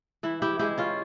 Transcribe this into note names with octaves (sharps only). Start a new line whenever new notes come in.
E3 E4
E4 G4
G#3 E4 G4
C#4 F4